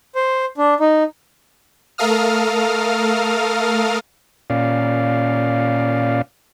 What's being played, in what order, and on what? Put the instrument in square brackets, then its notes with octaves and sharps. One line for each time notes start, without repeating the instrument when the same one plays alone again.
[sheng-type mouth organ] C5
D4
D#4
[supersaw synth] A3 A4 A#4 F5 D#6 F6
[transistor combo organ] A#2 C#4 D5 F5